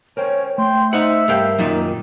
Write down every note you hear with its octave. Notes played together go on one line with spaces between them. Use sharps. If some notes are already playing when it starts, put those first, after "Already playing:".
C#4 A#4 C5 C#5 G5
A3 G5 C6
D#4 C5 E5 F#5
G2 A#4 F5 G5
F#2 A#2 D#3 F#3 D#4